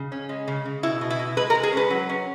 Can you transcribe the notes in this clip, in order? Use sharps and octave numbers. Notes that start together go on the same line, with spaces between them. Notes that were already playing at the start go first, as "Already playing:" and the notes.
Already playing: C#3
C#4
G#3
C#3
C#3
B2 E4
B2
E4
B2
G#3 B4
A#4
G#3
G#4
C#4 B4
F#3
C#4